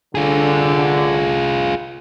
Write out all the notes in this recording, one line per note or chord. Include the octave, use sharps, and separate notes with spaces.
D3 F4 G#4